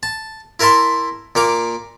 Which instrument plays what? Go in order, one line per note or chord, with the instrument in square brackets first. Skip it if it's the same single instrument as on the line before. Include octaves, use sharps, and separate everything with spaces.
[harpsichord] A5
E4 A#4 E5 A5 C6
A#2 A#3 F5 D6